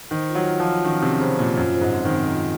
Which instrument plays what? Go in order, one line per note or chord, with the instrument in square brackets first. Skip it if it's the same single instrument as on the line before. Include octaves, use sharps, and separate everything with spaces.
[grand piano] D#3 [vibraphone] C5
[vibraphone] F4
[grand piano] F#3
[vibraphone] F4
[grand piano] F3
[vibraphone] F4
[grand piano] D#3 [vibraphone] C#4
[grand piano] C3 [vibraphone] C#4
[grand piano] C#3 [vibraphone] C5
[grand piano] A#2 [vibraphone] F4
[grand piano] F#2 [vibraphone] F4
[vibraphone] C5
[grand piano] G#2
[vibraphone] C4
[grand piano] D#3
[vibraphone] C4
F4